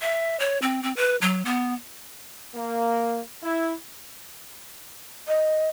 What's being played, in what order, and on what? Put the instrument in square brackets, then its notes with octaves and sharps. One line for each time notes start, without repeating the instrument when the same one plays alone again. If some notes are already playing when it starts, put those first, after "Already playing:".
[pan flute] E5
C#5
C4
C4
B4
F#3
B3
[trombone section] A#3
E4
[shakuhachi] D#5